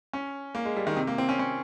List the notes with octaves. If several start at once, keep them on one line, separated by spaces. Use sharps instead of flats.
C#4
A#3
G#3
G3
D#3
C3
A#3
C4
C#4
C#4